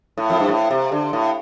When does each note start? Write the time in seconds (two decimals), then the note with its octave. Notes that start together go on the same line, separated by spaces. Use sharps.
0.18 A2
0.30 F2
0.40 G2
0.49 A2
0.71 C3
0.92 D3
1.13 A2